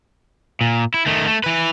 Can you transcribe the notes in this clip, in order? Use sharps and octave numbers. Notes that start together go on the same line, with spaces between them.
A#2
E4
D#3 A3
A3
E3 B4